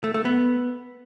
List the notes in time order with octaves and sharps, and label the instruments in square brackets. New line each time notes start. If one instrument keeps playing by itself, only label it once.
[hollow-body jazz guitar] A3
A3
B3